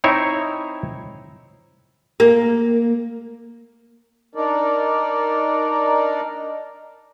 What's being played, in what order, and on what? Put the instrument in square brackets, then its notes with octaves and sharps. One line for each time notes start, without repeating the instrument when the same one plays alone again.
[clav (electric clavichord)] C4 D#4 E4 C#5 E5
[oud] A#3
[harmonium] D4 D#4 A#4 D5